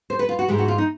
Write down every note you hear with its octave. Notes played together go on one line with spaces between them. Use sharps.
C5
B4
F4
F#4
G#2 E3 G#3 G4
F#4
F4
D#4